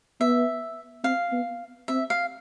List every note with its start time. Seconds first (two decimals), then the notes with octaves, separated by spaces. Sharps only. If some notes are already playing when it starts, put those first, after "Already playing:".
0.21 B3 E5
1.04 C4 F5
1.32 B3
1.88 C4 E5
2.10 F5